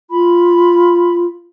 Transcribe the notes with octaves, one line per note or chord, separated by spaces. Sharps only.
F4 B5